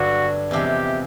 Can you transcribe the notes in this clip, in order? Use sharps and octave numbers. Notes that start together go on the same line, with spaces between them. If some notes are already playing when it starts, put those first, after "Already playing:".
Already playing: G2 D3 F#3 F#4
E2 C3 F3 G#3 G4